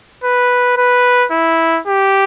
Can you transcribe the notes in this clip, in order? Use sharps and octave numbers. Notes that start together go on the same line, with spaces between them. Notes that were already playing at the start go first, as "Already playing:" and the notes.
B4
B4
E4
G4